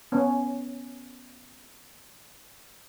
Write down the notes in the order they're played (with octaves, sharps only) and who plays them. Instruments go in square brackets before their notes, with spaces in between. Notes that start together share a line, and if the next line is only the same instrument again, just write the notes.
[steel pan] B3 C#4